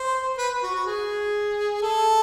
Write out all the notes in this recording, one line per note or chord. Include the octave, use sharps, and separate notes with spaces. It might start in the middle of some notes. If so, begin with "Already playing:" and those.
Already playing: C5
B4
F#4
F#4
G#4
A4